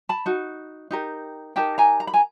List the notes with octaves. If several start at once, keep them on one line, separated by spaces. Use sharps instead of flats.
A5 B5
D#4 F#4
D#4 G4 A#4
D#4 G4 A#4 G5 A5
G#5 A#5
A#5
B5
G#5 A#5